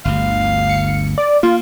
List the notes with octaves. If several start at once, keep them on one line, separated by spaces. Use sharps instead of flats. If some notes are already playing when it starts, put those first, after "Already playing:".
G1 D2 F5
C#7
D5
A#3 F4